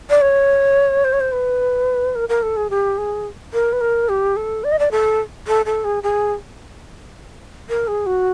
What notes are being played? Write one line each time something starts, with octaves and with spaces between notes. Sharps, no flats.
D5
C#5
C5
C#5
C5
B4
A#4
A#4
A4
G#4
G4
G#4
A#4
B4
A#4
G4
A4
D5
D#5
D5
A4
A4
A4
G#4
G#4
A#4
G#4
F#4